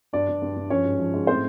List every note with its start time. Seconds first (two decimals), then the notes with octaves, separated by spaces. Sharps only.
0.13 G2 D4 D5
0.28 G2
0.42 G2
0.57 G2
0.70 F3 C#4 C#5
0.84 G#2
0.99 F3
1.14 G#2
1.27 A2 C4 C5